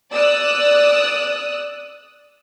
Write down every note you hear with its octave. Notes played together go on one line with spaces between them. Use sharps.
D5 D#6 E6 F#6